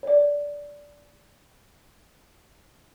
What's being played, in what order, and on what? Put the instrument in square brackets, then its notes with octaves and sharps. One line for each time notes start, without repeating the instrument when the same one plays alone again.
[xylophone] C#5 D5